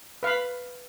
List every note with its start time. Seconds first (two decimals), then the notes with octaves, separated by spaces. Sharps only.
0.23 B4 F5 B5